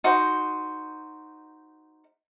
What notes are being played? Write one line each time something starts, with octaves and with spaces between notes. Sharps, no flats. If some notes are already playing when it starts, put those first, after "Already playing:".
D#4 F#4 C5